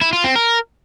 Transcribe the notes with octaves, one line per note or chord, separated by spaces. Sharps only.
E4
F4
C4
A#4